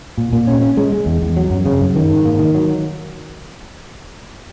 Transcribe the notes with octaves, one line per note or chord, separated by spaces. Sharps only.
A#2
A#2
C#4
C#4
G#3
G#3
E2
E2
F#3
F#2
C#3
F#2
D#3
G#2
A#3
D#3
F#3